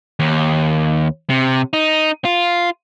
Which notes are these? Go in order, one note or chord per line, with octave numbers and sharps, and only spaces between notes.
D#2
C3
D#4
F4